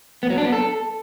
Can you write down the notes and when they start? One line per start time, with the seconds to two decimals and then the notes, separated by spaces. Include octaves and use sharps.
0.23 B3
0.30 F#3
0.38 D4
0.45 B3
0.52 A4